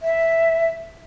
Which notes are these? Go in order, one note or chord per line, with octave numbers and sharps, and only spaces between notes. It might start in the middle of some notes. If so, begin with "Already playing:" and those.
E5